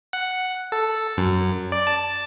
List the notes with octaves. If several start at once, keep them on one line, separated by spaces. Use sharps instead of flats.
F#5
A4
F#2
D5
A5